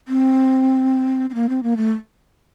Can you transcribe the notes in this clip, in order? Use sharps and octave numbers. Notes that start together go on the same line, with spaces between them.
C4
C4
A#3
C4
A#3
A3